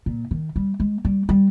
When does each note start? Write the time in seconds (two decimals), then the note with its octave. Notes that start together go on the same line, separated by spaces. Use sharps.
0.06 A#2
0.31 D#3
0.56 G3
0.80 G#3
1.05 G3
1.29 G3